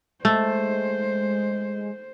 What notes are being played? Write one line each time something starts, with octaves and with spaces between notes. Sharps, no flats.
G#3 A3 C5